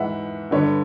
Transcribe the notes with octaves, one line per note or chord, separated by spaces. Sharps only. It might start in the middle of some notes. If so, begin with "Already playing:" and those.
Already playing: G#2 E3 E5 F#5
G2 D3 B4 C#5